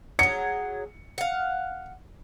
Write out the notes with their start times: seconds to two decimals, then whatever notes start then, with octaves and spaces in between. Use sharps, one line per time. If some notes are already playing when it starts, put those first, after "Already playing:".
0.19 F#3 G#4 C#7
1.18 F5 F#5